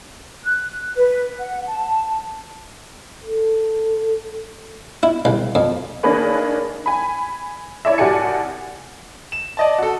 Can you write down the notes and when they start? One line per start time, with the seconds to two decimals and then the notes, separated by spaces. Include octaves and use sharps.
0.44 F#6
0.95 B4
1.39 F#5
1.66 A5
3.24 A4
5.03 E4
5.25 C2
5.55 F2
6.03 D#3 A#3 D4 G#4 B4 C#5
6.86 G#5 B5
7.85 E4 C#5 D5 E5
7.98 C2 F#4 G4 D5 G#5 C#7
9.32 E7
9.57 D5 D#5 A5
9.79 F#4 A4